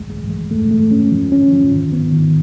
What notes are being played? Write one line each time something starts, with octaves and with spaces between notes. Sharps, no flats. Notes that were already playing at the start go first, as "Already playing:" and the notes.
Already playing: C2 G#3
G#3
G#3
A3
A3
C#4
F3
C#4
F3
D#3
B3
D#3